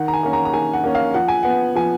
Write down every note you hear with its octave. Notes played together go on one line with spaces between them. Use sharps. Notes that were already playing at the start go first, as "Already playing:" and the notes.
Already playing: D#3 F#5
A#5
G#5
A#3 C#4
A#5
A#5
D#3 G#5
F#5
A#3 C#4
F5
F3 F#5
G#5
B3 F#5
F3 G#5